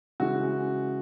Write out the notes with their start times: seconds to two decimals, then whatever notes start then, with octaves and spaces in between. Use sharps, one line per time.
0.20 C#3 E3 G#3 F#4